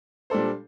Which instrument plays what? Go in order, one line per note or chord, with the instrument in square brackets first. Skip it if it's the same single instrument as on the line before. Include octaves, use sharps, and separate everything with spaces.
[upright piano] A#2 G3 D4 A4 C5